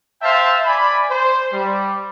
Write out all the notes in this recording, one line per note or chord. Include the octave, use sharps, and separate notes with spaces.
C5 E5 F5 G5 A5
D5 G#5 B5
C5
G3